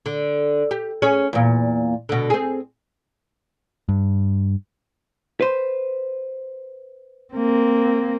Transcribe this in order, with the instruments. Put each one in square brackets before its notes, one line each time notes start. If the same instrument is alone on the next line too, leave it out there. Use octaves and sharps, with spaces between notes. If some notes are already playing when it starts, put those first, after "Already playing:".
[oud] D3
G4
C#4 G#4 C#5
E2 A#2
B2 D3
C4 G#4
[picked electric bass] G2
[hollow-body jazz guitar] B4 C5
[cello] A#3 C4